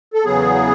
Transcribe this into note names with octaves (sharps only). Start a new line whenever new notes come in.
A4
E2 C#3 F#3 B3 G#4